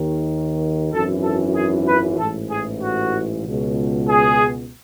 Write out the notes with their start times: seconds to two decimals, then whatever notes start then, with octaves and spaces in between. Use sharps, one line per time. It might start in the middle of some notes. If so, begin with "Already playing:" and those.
Already playing: D#2 D#3
0.93 G#1 F#2 E3 A4
1.24 A4
1.55 G#4
1.88 B4
2.19 A1 G#2 E3 A4
2.50 G#4
2.82 F#4
3.45 C#2 B2
4.08 G#4